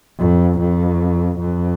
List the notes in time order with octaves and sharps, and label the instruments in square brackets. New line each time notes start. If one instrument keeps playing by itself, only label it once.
[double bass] F2
F2
F2